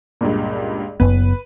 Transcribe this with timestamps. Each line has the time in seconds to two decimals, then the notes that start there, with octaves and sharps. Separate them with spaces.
0.21 C#2 G2 A#2
1.00 F#1 F#2 B3 B4